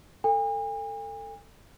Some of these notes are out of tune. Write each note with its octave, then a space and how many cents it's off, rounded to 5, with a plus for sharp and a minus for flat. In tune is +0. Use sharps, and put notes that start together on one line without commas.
A4 +20 G#5 -45